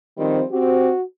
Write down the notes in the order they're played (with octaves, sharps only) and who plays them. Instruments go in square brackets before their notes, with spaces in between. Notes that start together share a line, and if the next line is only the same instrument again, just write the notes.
[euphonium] D#3 [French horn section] F3 G3 C4
[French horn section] C4 G4 [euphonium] F#4